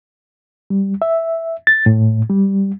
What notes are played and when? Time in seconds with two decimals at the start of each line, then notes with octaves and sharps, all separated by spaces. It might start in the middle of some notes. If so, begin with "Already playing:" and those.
0.70 G3
1.02 E5
1.67 A6
1.86 A2
2.30 G3